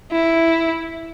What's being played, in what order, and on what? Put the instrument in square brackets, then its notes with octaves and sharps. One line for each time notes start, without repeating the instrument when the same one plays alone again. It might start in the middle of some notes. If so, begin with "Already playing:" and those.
[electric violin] E4